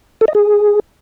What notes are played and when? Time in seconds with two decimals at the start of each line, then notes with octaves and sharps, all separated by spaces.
0.21 A4
0.28 D#5
0.35 G#4